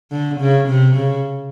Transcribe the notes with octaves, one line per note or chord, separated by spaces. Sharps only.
D3
C#3
C3
C#3